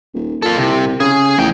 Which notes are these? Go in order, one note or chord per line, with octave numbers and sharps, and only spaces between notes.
D#1
A#2 F4 A4
C2 C3
C#3 G#4
A1 F3 G5